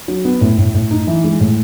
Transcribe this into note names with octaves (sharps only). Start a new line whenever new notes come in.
F#3
B3
A2
A2
A2
D#4
E3
G#3
A2